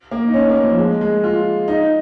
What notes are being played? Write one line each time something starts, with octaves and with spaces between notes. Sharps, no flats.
A#3
D#4
C#4
A#3
F3
G#3
G#3
F4
D#4